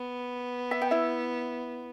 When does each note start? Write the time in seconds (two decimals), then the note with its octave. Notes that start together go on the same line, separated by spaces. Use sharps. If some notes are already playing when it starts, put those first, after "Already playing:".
Already playing: B3
0.71 E5
0.82 G5
0.91 E4 E5